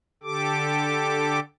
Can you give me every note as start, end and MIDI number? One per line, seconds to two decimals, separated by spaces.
0.23 1.40 50
0.23 1.40 67
0.23 1.40 69
0.23 1.40 86